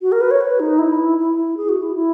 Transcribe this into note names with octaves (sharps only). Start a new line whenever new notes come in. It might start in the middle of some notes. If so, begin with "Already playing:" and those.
F#4
A#4
B4
C#5
B4
D#4
E4
E4
G#4
F#4
E4
E4